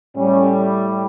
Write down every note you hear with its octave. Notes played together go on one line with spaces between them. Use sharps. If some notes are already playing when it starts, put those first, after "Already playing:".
A2 G3 C#4